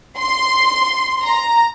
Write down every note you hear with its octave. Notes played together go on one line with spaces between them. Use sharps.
C6
A#5